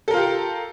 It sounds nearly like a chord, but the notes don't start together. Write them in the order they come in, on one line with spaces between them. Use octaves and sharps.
A4 A#4 F4 G4